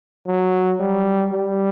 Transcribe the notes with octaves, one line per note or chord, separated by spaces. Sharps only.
F#3
G3
G3